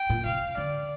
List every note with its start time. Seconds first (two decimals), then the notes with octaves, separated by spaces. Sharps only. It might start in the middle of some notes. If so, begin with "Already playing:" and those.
Already playing: G5
0.10 A#2
0.25 C3 F5
0.57 D3 D5